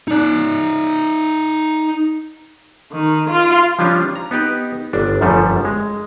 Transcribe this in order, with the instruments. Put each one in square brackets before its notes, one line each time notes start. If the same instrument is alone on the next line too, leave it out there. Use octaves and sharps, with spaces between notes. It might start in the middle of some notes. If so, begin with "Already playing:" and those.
[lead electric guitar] D#4 D5
[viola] D#3
F4
[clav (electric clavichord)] F3 G3 C#4 D4 F4
A#5
B3 D#4 G4 B4
G1 D4
G1 F#2 F3 G3 A3 A4
G#3